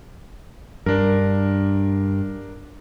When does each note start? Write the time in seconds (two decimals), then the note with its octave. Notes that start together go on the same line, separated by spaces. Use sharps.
0.86 G2 D4 A#4